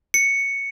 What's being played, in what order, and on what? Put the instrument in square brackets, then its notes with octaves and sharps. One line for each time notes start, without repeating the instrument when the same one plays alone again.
[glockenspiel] C#7